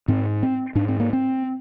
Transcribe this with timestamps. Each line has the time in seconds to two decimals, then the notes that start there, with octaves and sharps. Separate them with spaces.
0.08 G#2 C4
0.43 C4
0.75 G#2 D4
0.88 C4
1.00 A#3
1.13 C4